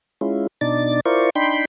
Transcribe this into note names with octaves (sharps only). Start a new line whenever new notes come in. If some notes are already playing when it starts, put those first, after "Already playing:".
G#3 C#4 E4 F4
B2 D4 D#4 D5 A6
E4 F4 A#4 C5 D5 C#6
D4 D#4 G5 B5 C6